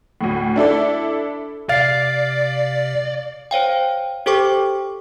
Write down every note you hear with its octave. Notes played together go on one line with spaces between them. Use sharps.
D2 A2
D4 E4 A4 D5
C3 D5 F5 A6 C7
C5 C#5 F5 G5
G4 A4 C5 G5 C#6 D6